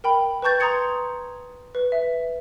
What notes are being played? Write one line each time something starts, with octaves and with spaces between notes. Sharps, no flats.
A#4 G5 B5
B4 G5 A5 C#6 G6 A6
A#5 C6 D#6 G#6 C#7
B4
E5